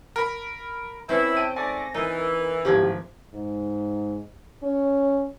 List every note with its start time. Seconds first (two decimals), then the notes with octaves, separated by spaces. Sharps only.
0.16 A#4 B5
1.09 C4 C#4 E4 A4 B4
1.36 G5 A5 D7 D#7
1.56 G#2 A3 D5 G#5 A6 A#6
1.94 E3 D#4 A#4
2.65 D1 G#1 F3 A#3 G4 G#6
3.34 G#2
4.63 C#4